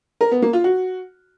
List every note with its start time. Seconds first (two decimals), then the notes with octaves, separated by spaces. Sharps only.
0.21 A#4
0.31 B3
0.42 A#3
0.53 F4
0.64 F#4